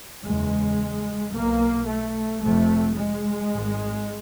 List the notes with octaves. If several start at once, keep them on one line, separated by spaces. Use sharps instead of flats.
F#1 E2 C#3 G#3
B1 B2 A#3
A3
F1 F2 C3 A3
G#3
G#1 G#2